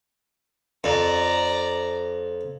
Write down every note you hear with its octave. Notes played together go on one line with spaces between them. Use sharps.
F2 D5 A#5